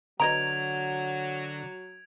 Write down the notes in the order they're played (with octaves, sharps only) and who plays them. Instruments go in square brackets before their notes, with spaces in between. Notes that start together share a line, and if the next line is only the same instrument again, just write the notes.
[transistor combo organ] D3 [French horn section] F#3 [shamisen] B4 D#5 A#5 [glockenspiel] G#6 D7 F7